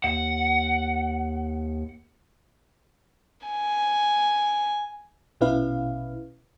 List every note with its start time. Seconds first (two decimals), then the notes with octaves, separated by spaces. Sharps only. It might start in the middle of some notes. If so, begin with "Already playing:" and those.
0.04 D#2 F#5
3.47 G#5
5.41 A#1 B2 C#4 E4 B4 F5